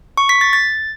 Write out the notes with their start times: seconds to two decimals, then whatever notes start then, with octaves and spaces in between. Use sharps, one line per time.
0.18 C#6
0.29 B6
0.41 A6
0.53 A6